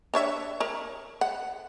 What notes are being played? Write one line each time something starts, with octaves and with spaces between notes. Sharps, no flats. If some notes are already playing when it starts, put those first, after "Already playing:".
D4 C#5 E5
A#4 C#5
F#5